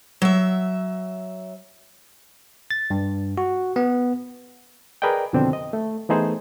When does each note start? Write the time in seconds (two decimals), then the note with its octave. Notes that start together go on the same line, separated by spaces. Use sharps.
0.22 F#3 E5
2.71 A6
2.90 G2
3.38 F#4
3.76 B3
5.02 G#4 A#4 B4 D5 D#5 G5
5.33 F2 B2 D3 D#3 C4 D4
5.53 D#5
5.73 A3
6.09 E3 A3 B3 D#4 G#4 C5